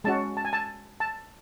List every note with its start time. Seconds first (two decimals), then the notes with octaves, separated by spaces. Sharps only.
0.04 G#3 C#4 F#4 A5
0.37 A5
0.45 G#5
0.53 A5
1.00 A5